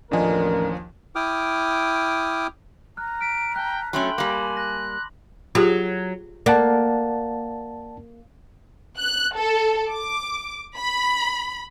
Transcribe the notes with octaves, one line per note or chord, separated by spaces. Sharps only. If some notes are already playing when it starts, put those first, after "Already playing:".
A1 D#2 F3 D4 A#4 D#5 G#5
E4 G5 D6 D#6 F6
A#5 F6 F#6
F6 B6 D7
G5 A5 F#6
F#3 A3 C#4 A4 G5 B5 C6 F#7
G3 A#3 G#5 D6 F#6 F#7
F#6 A#6
F#3 F4 G4 G#4
A#3 D5 F#5 A5
F#6
A4
D6
B5